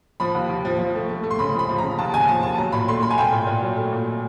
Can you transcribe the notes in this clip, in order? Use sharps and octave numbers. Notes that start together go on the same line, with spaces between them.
F3 B5
D#2
D#2
F3
F3
A3
A3
A3
C6
C#3 B5
F3
B5
F3
A#5
C#3
D#2 A5
C#3 G#5
F3 A5
D#2 A5
F#3 A#5
A#2 B5
A3 C6
A3 B5
G#5
C2 G5
A#2
A#2
F#3
A3
A#2